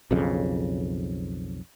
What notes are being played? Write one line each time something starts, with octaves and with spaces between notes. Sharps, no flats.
B1 F2 C#3